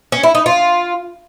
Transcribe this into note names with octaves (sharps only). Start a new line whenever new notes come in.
C#4
E4
D#4
F4